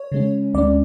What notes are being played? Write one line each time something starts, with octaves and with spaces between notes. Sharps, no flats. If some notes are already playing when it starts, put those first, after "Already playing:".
Already playing: C#5
C#3 G#3 C#4
D2 D3 G#3 C#4 D5